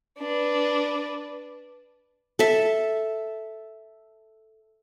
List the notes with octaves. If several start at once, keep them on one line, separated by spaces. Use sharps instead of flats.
D4 B4
A4 E5